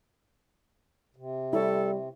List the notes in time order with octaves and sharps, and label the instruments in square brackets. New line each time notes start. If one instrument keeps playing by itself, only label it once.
[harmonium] C3
[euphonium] G3 [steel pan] E4 C#5 [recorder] A4